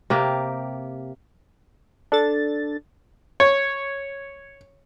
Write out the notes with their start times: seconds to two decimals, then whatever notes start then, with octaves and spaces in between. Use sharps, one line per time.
0.10 C3 A#3 G4
2.12 D4 A4 A6
3.40 C#5